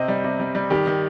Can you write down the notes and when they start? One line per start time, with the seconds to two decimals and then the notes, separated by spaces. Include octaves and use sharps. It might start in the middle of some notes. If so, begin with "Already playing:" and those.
Already playing: C3 C4 D#5
0.08 G3
0.24 C3
0.40 G3
0.55 G3
0.70 D#3 G4
0.87 D#3